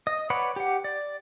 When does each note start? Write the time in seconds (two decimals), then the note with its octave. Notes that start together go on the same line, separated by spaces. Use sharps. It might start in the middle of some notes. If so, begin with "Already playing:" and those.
0.07 D#5
0.30 B4 C#5 D5 F#5 B5
0.56 G4 F#5
0.84 D5